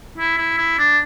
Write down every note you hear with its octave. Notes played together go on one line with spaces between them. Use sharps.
E4
E4
E4
D4